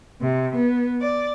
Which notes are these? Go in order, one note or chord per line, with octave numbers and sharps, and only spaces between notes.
C3
B3
D5